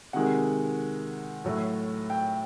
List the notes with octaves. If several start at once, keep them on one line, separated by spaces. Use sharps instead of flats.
C3 D#3 G#3 F#5
A2 F#3 A3
G5